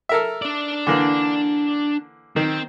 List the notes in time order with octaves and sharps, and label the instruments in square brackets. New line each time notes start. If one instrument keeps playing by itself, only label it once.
[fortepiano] A4 A#4 E5
[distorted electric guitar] D4 D5
[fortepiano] D3 E3 A#3
[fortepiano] D#3 [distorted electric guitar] C4